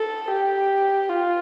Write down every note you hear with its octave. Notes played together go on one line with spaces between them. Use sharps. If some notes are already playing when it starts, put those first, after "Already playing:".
Already playing: A4
G4
F4